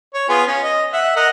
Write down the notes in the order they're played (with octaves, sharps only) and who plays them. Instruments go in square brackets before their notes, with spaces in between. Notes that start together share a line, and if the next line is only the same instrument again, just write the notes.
[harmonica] C#5
B3 F4 G#4
C#4
D#5
E5 F#5
A#4 D#5 F#5